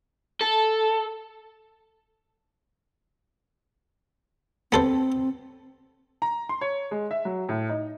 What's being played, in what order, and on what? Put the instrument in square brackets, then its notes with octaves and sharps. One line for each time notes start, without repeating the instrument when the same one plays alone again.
[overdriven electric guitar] A4
[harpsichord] B3 A4 C5 [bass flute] C4
[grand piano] A#5
C6
C#5
G#3
E5
F#3
A2
D#4